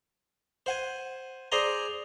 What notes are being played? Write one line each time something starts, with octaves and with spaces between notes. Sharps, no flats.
C5 F#5 G#5
G#4 C5 D5 G#5 A#5 C6